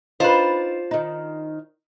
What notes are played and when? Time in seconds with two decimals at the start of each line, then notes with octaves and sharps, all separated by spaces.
0.20 D4 D#4 F4 B4 C5
0.91 D#3 D#4